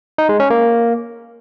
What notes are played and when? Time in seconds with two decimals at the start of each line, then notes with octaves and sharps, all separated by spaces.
0.18 D#4
0.29 G#3
0.40 C#4
0.50 A#3